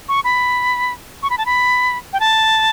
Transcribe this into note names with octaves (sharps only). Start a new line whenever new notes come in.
C#6
B5
C#6
B5
A5
B5
G5
A5